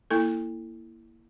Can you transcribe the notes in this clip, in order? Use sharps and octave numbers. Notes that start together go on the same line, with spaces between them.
A#3 E4 A4